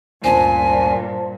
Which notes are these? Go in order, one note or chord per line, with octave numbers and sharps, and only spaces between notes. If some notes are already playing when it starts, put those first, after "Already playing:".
D2 G2 A#2 C#4 C5 G#5 A5